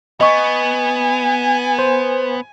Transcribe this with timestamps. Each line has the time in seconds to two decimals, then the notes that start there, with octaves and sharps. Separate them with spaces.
0.21 B3 D#5 G#5 C#6
1.79 C5